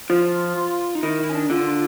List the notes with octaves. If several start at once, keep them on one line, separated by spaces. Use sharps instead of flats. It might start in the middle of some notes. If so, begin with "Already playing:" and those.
F3 F4
D#4
D#3 E4
E4
C#4
D4
D3 F4